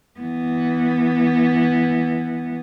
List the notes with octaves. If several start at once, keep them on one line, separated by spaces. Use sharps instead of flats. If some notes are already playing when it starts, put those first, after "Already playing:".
E3 B3